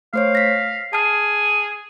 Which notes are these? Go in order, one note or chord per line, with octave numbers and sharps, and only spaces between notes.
A3 C5 C#5 F5
A#6 B6
G#4 A5 F6